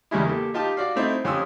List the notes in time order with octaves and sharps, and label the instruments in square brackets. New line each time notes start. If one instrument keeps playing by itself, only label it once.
[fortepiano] E2 C#3 G3 G#3 E4
A#3 G4 A4
D#4 F4 G4 A5
F#4 D5 F5
A3 C4 D#4 E4
F2 C#4 G4 C6 D#6 E6